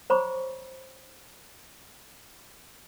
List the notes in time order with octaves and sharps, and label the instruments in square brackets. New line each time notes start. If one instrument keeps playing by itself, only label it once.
[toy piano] C5 C#5 A#5 B5 C#6 D6